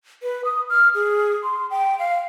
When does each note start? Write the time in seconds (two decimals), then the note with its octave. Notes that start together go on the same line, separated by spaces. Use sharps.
0.23 B4
0.45 D#6
0.70 F6
0.95 G#4
1.43 C6
1.70 G5
1.99 F5